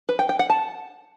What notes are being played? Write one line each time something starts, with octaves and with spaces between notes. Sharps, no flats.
B4
G5
G5
F#5
A5